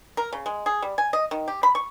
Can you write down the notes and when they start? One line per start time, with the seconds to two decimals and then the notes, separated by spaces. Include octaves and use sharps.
0.17 A#4
0.33 C#3
0.46 G#3
0.66 G#4
0.82 G3
0.98 G#5
1.13 D#5
1.31 D#3
1.48 G4
1.63 B5
1.75 C#6